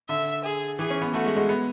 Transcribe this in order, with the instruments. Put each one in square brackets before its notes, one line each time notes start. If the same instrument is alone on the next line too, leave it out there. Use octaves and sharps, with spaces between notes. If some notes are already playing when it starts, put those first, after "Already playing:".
[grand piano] D3 [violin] E5
[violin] G#4
[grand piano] E3 [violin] G#4
[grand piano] C#4
B3
[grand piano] A3 [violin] F#4
[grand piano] G#3
G#3
B3